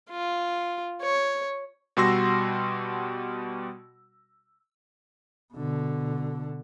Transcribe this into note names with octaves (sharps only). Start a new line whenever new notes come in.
F4
C#5
B2 G3 F#4 C6 E6 A#6
B2 D3